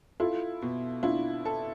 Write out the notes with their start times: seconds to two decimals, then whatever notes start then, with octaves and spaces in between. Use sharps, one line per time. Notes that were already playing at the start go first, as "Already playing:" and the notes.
0.20 E4 F4 A4
0.62 B2
1.03 D4 E4 F4
1.45 A4